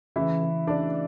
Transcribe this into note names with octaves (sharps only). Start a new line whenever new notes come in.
C#3 E3 E4
C#3
C#3 D4 D5